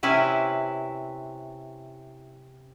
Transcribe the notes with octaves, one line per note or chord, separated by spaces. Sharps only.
C3 C#4 E4 B4